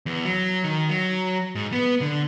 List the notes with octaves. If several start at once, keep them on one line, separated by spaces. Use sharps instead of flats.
E2
F#3
D#3
F#3
G#2
B3
D3